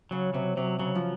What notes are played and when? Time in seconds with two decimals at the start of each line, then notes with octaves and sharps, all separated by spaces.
0.11 C#3 F#3
0.34 C3 F#3
0.57 C3 F#3
0.79 C#3 F#3
0.95 F3